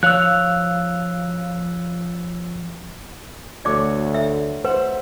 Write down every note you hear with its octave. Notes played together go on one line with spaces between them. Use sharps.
F3 C#5 F5 E6 F#6
D2 A3 F#4 C#5 D5 D6
E5
B4 C5 E5 F#5